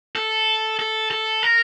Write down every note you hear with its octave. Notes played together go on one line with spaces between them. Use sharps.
A4
A4
A4
A#4